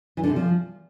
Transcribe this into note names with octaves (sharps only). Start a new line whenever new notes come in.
E3
D3
C3
F3